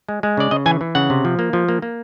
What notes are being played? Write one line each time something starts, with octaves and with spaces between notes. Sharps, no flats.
G#3
G#3
C#3 D5
C#3 D#5
E3 G#5
E3
C#3 F#5
C3
F3
A#3
F3
A#3
A#3